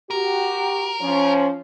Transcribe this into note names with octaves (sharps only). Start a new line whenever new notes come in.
F#4 G4 A#4
F3 C#4